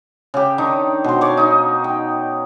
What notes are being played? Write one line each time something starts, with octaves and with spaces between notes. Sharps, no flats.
C#3 G4
D#3 D4 D#4 A#5
B2 C5
C#5 D5 F5 D6
D#4 D#5
G5